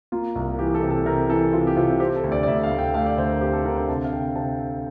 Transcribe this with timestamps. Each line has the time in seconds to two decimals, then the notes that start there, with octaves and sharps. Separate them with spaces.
0.12 A#3 F4
0.35 C2
0.59 E3 G4
0.75 A4
0.83 C3
0.90 A4
1.06 C3 A#4
1.29 E3 A4
1.53 C3 F4
1.67 G4
1.77 C3 F4
2.00 C4 G4
2.16 A4
2.24 D2
2.32 D5
2.43 D5
2.47 D2 E5
2.63 F5
2.71 D2
2.79 G5
2.94 A3 F5
3.06 D5
3.17 D2 C5
3.30 A#4
3.41 C4 G4
3.53 A4
3.65 D3 A#4
3.77 C5
3.89 C3 A5
4.04 F5
4.12 C3 G5
4.35 C3 A5